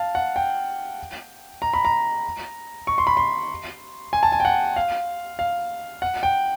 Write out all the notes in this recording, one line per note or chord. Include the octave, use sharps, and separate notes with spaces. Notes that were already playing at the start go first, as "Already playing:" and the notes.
Already playing: F5 A5
F#5
G5
A#5
B5
A#5
C#6
C6
B5
C6
G#5
A5
G#5
G5
F#5
F5
F5
F#5
G5